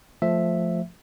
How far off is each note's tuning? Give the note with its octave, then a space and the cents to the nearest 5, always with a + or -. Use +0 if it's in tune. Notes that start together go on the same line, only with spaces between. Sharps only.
F3 +0 A3 +0 E5 +0